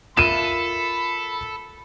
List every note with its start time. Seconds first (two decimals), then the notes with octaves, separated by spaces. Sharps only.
0.17 F4 A4 A#4 E5 B5 D#7 E7